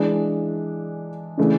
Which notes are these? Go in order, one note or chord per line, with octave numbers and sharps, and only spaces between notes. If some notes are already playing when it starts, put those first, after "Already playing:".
Already playing: E3 G#3 D4
C#3 E3 A3 D4